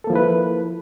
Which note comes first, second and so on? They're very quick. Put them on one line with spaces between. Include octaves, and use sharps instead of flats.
A4 A#3 F3 E4 B4